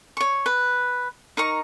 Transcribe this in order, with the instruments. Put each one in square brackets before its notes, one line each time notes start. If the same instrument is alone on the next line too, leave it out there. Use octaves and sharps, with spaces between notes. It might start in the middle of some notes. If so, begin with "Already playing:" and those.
[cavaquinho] C#5 C#6
B4
D#4 A#4 C#6